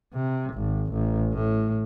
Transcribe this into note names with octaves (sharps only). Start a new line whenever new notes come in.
C3
G#1
A1
A2